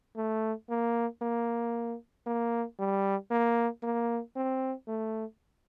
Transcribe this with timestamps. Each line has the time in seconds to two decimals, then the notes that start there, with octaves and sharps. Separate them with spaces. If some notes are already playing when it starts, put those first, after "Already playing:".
0.16 A3
0.70 A#3
1.22 A#3
2.27 A#3
2.79 G3
3.31 A#3
3.83 A#3
4.36 C4
4.88 A3